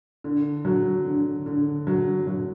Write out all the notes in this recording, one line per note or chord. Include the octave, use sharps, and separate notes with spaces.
D3
F#3
D3
D3
F#3
F#3